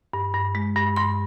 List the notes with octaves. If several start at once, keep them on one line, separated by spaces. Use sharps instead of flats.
G2
G2
G#3
G2
G2 C6